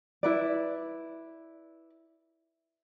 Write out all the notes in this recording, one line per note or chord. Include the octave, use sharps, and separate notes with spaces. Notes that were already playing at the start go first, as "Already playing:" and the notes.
E4 B4 D5